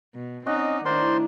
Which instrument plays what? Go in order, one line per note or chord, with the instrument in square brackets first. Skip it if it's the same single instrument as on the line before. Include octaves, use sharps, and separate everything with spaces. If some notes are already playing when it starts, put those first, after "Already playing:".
[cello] B2
[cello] C4 D#4 [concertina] C#4 D#5 [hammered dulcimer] D5 F#5
[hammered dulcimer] A2 A#4 [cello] D#3 D4 [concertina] C5 D5 C6